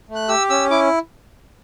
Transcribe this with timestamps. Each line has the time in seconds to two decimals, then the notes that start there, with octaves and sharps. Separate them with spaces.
0.09 A3
0.15 F#6
0.28 G4 E6
0.50 C#4 E6
0.70 E4 D6